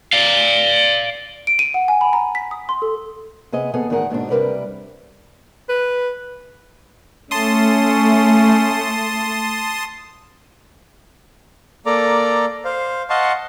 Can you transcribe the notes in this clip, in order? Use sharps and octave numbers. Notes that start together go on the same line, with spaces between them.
D5 F5
D7
D#7
F#5
G#5
B5
A#5
B6
D#6
C6
A4
C3 B3 G#4 D#5
D#2 B3 G#4 A4 D#5
E2 A2 D#3 G#4 A#4 F#5
D#2 G#2 B2 D4
C3 E3 G3 A#4 B4 D5
B4
A3 C#4 A5 C6 D#6
A#3 A4 D5 A#5 D6
C5 F5
D#5 F5 F#5 A5 C6 C#6